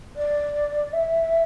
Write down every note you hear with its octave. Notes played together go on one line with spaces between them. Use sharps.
D5
E5